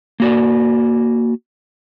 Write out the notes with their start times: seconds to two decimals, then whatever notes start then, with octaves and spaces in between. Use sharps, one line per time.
0.20 A#3 F#4 D5